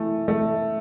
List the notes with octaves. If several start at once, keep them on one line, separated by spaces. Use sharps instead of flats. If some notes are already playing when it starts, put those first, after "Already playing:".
Already playing: E3 A3
A3